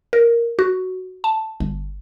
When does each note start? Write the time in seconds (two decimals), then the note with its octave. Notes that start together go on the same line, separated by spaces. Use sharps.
0.13 A#4
0.59 F#4
1.24 A5
1.60 G1